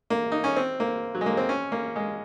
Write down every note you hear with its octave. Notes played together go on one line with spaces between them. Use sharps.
A#3
D#4
C#4
C4
A#3
F#3
G#3
A#3
C4
C#4
A#3
G#3